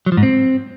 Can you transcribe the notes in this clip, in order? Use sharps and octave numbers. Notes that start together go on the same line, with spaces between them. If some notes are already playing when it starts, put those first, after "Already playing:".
F#3
F3
G#2
C4